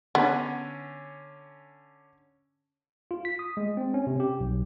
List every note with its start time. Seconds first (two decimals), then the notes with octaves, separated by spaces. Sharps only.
0.15 D3 B3 C#4
3.11 F4
3.25 B6
3.39 D#6
3.57 G#3
3.77 C4
3.94 C#4
4.07 C3
4.20 G4
4.40 B1